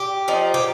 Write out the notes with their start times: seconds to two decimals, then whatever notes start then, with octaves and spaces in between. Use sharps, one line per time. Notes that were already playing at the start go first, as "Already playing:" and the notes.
Already playing: G4
0.28 F3 D#4
0.54 G4